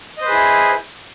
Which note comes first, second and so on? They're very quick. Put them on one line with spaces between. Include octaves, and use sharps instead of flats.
D#5 C5 B4 G#4 E4